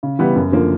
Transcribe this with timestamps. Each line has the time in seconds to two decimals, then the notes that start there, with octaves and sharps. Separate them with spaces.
0.03 C#3
0.19 E3 G3 B3
0.35 F#2
0.52 D3 F3 A#3